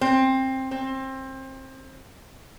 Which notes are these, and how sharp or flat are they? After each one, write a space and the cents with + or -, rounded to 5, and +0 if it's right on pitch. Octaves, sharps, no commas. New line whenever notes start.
C4 +15
C4 +25